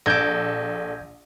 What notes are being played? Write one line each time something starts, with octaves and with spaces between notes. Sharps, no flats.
A#1 A4 D6 G6 G#6 A#6